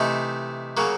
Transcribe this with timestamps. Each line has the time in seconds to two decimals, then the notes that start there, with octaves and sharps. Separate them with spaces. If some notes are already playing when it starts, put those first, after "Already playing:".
Already playing: C3 E3 A3 C4 D#4
0.77 C#3 F#3 A#3